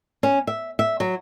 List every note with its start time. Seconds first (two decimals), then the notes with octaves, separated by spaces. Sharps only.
0.23 C#4
0.47 E5
0.79 E5
1.00 F#3